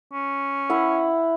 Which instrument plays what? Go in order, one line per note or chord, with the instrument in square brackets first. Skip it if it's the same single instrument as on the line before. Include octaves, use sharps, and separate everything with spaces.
[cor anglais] C#4
[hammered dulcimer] E4 E5 F#5